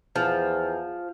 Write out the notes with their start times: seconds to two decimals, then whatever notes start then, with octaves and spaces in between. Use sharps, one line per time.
0.16 E2 F3